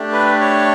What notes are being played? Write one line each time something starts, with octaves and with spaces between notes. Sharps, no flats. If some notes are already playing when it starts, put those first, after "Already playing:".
Already playing: A3 D4 G4
B4
C#5